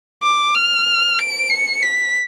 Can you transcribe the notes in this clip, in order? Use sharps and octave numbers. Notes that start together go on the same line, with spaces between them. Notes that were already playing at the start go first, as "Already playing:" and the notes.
D6
F6
D7
C#7
B6